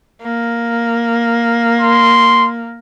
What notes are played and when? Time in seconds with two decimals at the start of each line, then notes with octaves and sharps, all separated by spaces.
0.22 A#3
1.81 C6